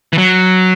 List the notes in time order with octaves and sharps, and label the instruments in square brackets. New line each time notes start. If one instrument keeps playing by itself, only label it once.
[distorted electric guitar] E3
F#3